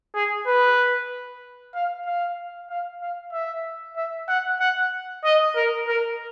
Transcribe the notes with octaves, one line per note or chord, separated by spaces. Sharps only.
G#4
B4
F5
F5
F5
F5
E5
E5
F#5
F#5
D#5
A#4
A#4